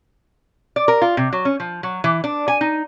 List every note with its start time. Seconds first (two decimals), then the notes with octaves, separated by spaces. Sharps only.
0.76 D5
0.88 A#4
1.02 F4
1.17 C3
1.33 F#3
1.45 C#4
1.60 F3
1.83 F#3
2.04 E3
2.24 D4
2.48 G#5
2.61 D#4